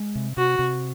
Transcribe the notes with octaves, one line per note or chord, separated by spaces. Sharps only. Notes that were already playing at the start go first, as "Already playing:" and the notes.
Already playing: G#3
C3
C3 F#4
C3